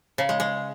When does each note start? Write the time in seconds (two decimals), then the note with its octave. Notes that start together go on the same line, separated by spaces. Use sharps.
0.18 C#3
0.29 G#3
0.40 G#3